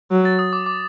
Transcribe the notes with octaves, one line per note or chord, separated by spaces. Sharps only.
F#3
A6
D#6
D6
D6